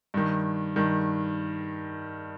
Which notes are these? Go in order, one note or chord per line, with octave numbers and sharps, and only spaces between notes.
G2 D#3
G2 D#3